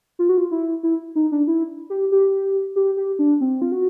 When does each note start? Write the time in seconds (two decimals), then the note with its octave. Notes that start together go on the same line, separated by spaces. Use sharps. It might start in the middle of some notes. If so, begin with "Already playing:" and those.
0.19 F4
0.29 F#4
0.38 F4
0.51 E4
0.83 E4
1.15 D#4
1.32 D4
1.47 E4
1.90 G4
2.12 G4
2.76 G4
2.97 G4
3.19 D4
3.41 C4
3.62 F4
3.72 F#4